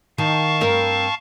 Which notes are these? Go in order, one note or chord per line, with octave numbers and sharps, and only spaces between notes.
D#3 F5 A5 C#6
G2 C4 A#4